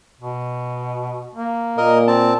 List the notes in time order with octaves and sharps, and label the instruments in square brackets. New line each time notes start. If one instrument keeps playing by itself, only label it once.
[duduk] B2
A#3
[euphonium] A#2 [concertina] A#4 D#5
[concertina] C4 A5